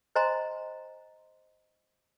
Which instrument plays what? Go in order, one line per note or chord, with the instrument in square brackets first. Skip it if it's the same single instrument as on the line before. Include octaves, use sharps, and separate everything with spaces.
[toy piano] C5 D#5 G#5 A#5 C6